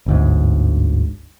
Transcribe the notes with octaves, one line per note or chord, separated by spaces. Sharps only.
G1 D2 G#2